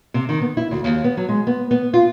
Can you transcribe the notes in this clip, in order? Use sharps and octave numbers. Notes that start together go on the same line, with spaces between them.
C3
D#3
B3
E4
D2
D#2
B3
F#3
G#3
B3
B3
F4